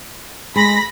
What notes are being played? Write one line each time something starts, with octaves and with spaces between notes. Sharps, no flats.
G#3 B5 A#6 B6